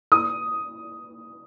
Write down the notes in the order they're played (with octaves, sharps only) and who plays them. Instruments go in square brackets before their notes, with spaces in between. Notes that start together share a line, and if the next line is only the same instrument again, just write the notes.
[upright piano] D#6